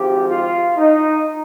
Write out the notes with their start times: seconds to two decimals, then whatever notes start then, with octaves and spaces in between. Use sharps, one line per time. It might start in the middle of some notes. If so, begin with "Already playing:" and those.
Already playing: G#1 G#2 F3 G4
0.28 F4
0.76 D#4